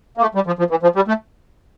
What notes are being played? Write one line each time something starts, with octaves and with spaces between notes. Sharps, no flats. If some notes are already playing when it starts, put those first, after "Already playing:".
A#3
A3
G3
F3
F3
E3
F3
G3
A3